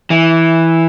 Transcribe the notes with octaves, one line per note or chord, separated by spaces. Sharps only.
E3